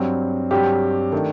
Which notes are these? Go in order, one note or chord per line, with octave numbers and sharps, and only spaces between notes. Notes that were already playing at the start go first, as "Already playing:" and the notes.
Already playing: G2 F#3 C4
G2 F#3 C4 G4
D#3 A3 D4